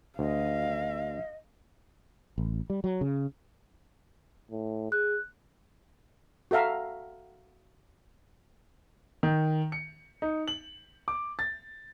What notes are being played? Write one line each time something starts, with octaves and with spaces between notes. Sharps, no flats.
D2 D#5 F5
A1
G3
F#3
C#3
A2
G#4 F#6
F#4 A4 E5 F5 A#5
D#3
C#7
D#4
F#7
D6
A6